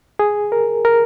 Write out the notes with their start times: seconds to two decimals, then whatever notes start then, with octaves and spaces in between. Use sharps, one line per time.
0.19 G#4
0.52 A#4
0.85 A#4